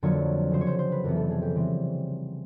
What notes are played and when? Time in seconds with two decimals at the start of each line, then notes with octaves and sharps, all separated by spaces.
0.03 F2 D3 F#3 A#3 C#5
0.52 C#3 F#3 A#3 C5
0.61 C#5
0.67 C5
0.79 C5
0.92 B4
1.04 F2 C3 E3 G3 B3 A#4
1.16 A4
1.30 G#4
1.42 G4
1.55 C#3 E3 G3 C4